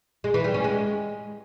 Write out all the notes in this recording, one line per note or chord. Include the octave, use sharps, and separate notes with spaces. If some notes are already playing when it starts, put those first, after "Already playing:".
G#3
E3
G3
C#4
G#3